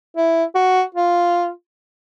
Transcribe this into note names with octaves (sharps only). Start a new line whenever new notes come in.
E4
F#4
F4